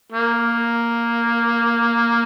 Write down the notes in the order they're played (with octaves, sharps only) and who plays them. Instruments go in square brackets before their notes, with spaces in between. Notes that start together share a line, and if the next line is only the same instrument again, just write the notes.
[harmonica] A#3